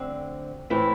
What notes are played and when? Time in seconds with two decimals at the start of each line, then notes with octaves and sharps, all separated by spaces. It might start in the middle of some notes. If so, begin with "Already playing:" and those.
Already playing: D2 D3 C4
0.70 A2 E3 C4 E4